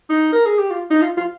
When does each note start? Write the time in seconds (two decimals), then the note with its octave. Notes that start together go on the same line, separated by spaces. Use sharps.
0.10 D#4
0.32 A#4
0.46 G#4
0.59 G4
0.70 F4
0.90 D#4
1.02 F4
1.17 F4